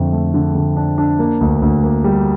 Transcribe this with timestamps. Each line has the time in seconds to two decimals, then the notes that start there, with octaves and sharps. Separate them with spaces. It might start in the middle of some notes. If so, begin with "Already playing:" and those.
Already playing: F2 D3 A3
0.12 A3
0.34 D3
0.55 D3
0.77 D4
0.98 D4
1.19 A#3
1.41 D2
1.62 D2
1.84 A#3
2.04 G3